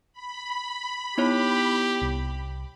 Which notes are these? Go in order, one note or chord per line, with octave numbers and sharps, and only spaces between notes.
B5
B3 D#4 E4 G4 C#5
C2